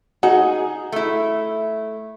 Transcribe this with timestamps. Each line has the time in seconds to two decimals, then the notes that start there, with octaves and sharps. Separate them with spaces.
0.23 D#4 F#4 G#4
0.92 A3 E4